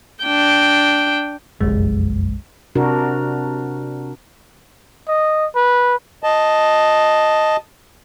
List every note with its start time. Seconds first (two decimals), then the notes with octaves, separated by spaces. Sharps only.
0.24 D4 G5
1.61 F#1 B1 F2 G#3
2.75 C3 D4 F#4 A#4
5.08 D#5
5.56 B4
6.23 D#5 A5